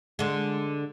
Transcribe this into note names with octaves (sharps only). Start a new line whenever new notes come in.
D3 G#3